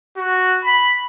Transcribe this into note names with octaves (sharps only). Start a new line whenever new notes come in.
F#4
B5